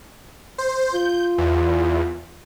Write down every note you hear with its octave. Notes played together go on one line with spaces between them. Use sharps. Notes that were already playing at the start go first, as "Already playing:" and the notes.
C5
F4 G6
E2